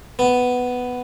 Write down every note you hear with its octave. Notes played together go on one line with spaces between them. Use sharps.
B3